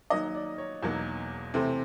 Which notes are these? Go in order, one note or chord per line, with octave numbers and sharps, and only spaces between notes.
D#3 F#3 A#3 D#4 D#5
D5
C#5
E2 B2 F#3 A#3 D#4
C3 E3 A3 C4